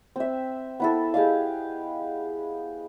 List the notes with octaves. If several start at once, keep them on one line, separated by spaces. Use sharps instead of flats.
C4 E5
B3 E4 A4
G4 G#4 D#5 F5